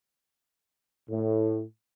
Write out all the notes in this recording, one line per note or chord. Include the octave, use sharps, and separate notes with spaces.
A2